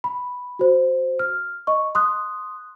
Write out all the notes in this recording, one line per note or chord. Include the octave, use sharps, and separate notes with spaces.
B5
F#4 C5
F6
D#5 C#6
C6 D#6 F#6